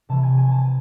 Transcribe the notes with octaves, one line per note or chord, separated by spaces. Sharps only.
C3 E3 A5
G#5
G#5
A5
G#5